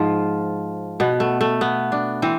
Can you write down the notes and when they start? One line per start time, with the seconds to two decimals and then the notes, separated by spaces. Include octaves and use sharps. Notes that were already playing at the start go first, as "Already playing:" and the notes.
Already playing: G#2 F3 F4
1.00 B2 B3
1.20 A3
1.41 A3
1.61 B3
1.92 D4
2.22 E3 C4